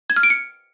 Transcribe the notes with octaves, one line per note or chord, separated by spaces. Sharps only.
G#6
F6
D7
C#7